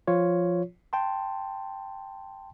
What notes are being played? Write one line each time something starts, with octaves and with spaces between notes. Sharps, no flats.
F3 F4 C#5
G5 A5 C6